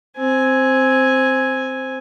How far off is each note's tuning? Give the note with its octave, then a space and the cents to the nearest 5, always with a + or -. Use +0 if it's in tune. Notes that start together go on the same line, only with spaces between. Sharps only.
C4 +0 G#5 +0